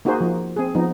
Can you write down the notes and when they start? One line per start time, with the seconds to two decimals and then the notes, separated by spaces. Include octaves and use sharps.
0.05 A#3 D#4 F#4 G#4 C5
0.21 F3 A#3
0.57 C4 G#4
0.75 F3 B3 D#4